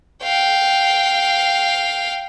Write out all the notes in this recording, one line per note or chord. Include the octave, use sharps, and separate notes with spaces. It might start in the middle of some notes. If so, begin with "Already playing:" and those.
F5 G5